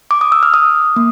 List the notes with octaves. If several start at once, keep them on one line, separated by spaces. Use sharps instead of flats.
D6
D#6
E6
F6
D#6
A#3